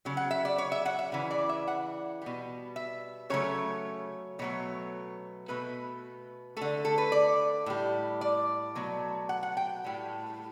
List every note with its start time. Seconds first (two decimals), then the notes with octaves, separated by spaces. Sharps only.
0.05 C#3 F#3
0.17 F#5
0.31 E5
0.45 D5
0.58 C#5
0.72 E5
0.85 F#5
0.99 E5
1.12 C#3 E3
1.31 D5
1.49 E5
1.67 F#5
2.22 B2 G3
2.76 E5
3.30 C#3 F#3 A3 C#5
4.39 B2 F#3 A3 C#5
5.48 B2 A3 B4
6.57 D3 A3 A4
6.85 A4
6.98 B4
7.12 D5
7.66 A2 G3
8.21 D5
8.75 B2 F#3 A3
9.29 F#5
9.43 F#5
9.57 G5
9.84 A2 G3